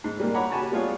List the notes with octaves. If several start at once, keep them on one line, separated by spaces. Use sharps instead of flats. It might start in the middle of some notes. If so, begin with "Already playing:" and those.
G#2
A#2 G3 A#3
C#5 F#5 A#5 B5 D6
F#4 G4 G#5 A5 B5 C#6
G3 B3 F4 G#4 C#5